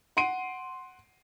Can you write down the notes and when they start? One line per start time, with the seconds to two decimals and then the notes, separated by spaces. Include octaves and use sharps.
0.17 F#5 C6 C7 D7 D#7